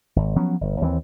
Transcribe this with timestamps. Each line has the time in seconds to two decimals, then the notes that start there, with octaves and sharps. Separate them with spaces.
0.16 G#1
0.36 F3 F#3 B3 C#4
0.61 G1
0.81 D#2 E3 A3 C4